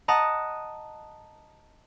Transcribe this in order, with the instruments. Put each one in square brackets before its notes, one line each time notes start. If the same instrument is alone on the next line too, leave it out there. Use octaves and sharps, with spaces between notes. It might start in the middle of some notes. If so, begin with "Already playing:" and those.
[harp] D#5 F#5 A5 A#5 D#6